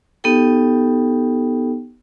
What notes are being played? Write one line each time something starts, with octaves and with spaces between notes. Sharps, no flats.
B3 D#4 G4 A4 G5